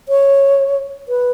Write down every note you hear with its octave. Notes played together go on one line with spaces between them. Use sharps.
C#5
B4